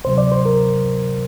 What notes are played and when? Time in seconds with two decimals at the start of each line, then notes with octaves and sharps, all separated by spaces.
0.04 D2 C3 F#3 C5
0.18 D5
0.32 C5
0.45 A#4